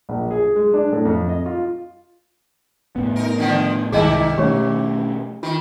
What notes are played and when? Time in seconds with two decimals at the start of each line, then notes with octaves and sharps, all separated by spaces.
0.09 A#1
0.31 G#4
0.56 G#3
0.74 D4
0.93 A2
1.05 F2
1.29 D#5
1.46 F4
2.96 A2 B3
3.16 D#4 A#4
3.38 D3 D#3 F3
3.92 C2 G#2 D#3 A#3 E4 G#4 D#5 A5
4.38 B2 A3 C#4 G4 C#5
5.43 D#3 F4